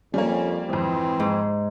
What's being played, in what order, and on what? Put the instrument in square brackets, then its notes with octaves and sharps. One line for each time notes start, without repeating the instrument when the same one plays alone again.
[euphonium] F2 [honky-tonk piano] G3 A#3 [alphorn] C#4
[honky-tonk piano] G#1 F2 [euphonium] E3 [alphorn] C4
[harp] G#2